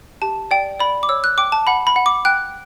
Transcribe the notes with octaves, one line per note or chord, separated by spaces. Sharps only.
G4 A5
D5 G5
D5 B5
D6
C#5 E6
F#6
G5 D6
A5
F#5 B5
B5
F#5
D6
G5 F#6